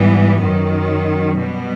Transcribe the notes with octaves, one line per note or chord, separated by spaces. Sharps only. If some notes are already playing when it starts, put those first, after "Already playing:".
Already playing: G#2 E3 G3 B3
F#2 D#3 F#3
B2 G3 B3